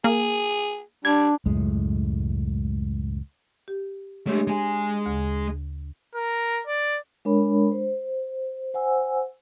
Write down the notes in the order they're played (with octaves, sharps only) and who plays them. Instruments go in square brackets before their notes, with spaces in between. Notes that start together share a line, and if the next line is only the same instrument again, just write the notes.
[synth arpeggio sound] A#3 [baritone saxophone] G#4
[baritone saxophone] G3 [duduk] D4 [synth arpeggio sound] G#6
[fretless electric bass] C#2 F#2 A2 G#3
[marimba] G4
[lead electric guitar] G#3 A3 [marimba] D4 G4 C#5
[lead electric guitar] G#3 G#4
[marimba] D2 C#3
[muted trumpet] A#4
D5
[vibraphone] G#3 D4 A#4 C#5 B5
C5
C5 F#5 G#5 E6